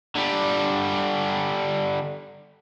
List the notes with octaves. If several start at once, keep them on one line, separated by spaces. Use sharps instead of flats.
D3 G3